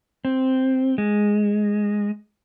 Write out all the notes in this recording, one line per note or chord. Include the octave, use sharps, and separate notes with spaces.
C4
G#3